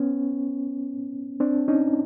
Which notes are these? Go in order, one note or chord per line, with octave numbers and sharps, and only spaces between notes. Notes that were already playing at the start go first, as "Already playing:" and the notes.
Already playing: B3 C#4
C4 D4
C#4 D#4